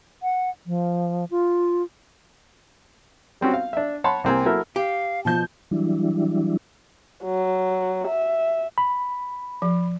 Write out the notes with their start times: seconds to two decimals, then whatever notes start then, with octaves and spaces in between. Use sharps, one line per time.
0.23 F#5
0.67 F3
1.31 F4
3.41 G3 C4 C#4 F#4
3.54 F5
3.73 D4 E5
4.04 C#5 F#5 A5 B5 C6
4.24 C2 A#3 C4 G4 G5 G#5
4.46 F#3 A#3 E4 A4 A#4
4.76 G4 F5
5.25 B2 F3 A5 G6
5.71 E3 F#3 G3 D4 E4
7.24 F#3
8.08 E5
8.78 B5
9.62 F3